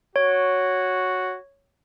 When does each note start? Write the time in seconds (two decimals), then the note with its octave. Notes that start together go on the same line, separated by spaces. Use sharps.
0.16 F#4 C#5